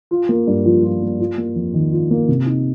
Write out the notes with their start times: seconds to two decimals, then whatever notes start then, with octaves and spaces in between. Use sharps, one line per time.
0.11 F4
0.29 A#3
0.47 G2
0.66 F3
0.83 F4
1.02 A#3
1.20 F4
1.38 A#3
1.55 F2
1.74 D#3
1.93 F4
2.11 A#3
2.28 C3
2.46 D#4